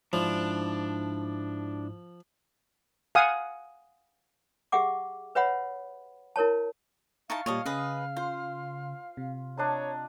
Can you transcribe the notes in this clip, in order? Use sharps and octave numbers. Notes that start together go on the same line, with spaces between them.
G#2 F3 D4 E4
F5 F#5 G#5 D#6
G4 G#4 E5 F#5 D6
B4 C#5 E5 F#5 B5
E4 A#4 C#5 A5
D#4 E4 F5 A5 C#6
A#2 G3 C#5 D#5 A5
C#3 G#4 B4 D#5
F4 C5
C3
D4 C#5 D#5 A#5